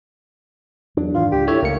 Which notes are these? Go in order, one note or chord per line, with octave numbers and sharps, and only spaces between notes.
E2 F#3 D4
G#2 D#3 E3 F4
C#2 G4
A2 G4 C#5 E5
C#2 A3 A#3 D4 C#7